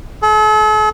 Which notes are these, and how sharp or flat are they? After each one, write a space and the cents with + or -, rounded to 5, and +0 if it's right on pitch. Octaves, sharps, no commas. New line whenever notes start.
A4 -45